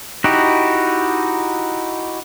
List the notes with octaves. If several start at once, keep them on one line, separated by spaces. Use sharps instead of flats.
D#4 E4 F#4 G4